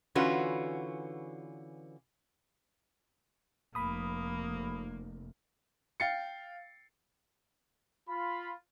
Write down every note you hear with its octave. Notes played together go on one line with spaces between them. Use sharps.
D3 E3 C#4 F4 F#4 B4
F1 A#3 B5 D#6
F5 G5 A6 C7 C#7
F4 B5